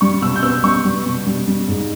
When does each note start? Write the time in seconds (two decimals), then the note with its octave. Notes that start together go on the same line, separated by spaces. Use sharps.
0.01 G3 C#6
0.22 B2 E6
0.36 G6
0.43 B3 E6
0.64 G3 C#6
0.85 G3
1.06 B2
1.26 G3
1.48 G3
1.68 G#2